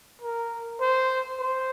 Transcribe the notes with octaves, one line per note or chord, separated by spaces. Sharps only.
A#4
C5
C5